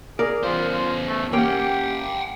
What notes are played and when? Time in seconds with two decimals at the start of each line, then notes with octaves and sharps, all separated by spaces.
0.19 G#4 A#4 D5
0.44 E2 F4 C5
0.73 F4
1.08 A3
1.33 A#3 C#4 G4 F#5 G5